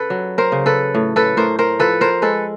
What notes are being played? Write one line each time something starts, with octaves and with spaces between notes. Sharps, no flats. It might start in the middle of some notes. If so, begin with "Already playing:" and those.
Already playing: C#3 A4 B4
F#3
A#4 C5
C#3
A4 B4
A2
A4 B4
A2 A#4 C5
A#4 C5
F3 A4 B4
A#4 C5
G#3 A4 B4